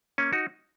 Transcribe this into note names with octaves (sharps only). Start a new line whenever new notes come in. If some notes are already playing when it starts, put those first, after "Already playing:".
A#3 C#4
D#4 F#4